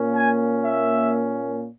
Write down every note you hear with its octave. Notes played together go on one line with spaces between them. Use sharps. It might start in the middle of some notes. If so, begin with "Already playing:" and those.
Already playing: A#2 A#3 C#4
G#5
E5